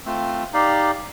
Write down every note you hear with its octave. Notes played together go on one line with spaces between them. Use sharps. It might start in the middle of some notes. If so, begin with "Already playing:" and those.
A3 C4 F4
D#4 G4 D5 F5